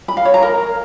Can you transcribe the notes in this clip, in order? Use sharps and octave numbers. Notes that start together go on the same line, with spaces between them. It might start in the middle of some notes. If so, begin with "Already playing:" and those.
B5
F5
C#5
A#5
A#4